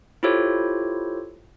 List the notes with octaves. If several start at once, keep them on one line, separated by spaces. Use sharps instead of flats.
E4 F4 G4 A4 C5 C#5